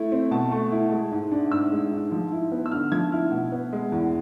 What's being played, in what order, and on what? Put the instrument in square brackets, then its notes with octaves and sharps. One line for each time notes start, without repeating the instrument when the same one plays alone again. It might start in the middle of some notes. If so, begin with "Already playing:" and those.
Already playing: [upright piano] A3 E4
C4
B2 A5
A3
E4
G#3
G#2
D4
G#2 E6
G#3
G#2
F3
E4
B3
E6
D3 F6
F3 G#6
E4 F6
B2
B3
G#3
E2